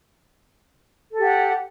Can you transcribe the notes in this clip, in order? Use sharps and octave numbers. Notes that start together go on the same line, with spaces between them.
G4 A4 F#5